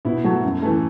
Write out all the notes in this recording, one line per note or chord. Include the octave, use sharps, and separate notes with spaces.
B2 E4
F#3 A3
F#2
E3 A3